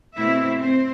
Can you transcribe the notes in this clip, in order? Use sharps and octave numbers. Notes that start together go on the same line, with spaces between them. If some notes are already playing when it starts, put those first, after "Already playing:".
B2 A3 C4 E4 E5
C4 C5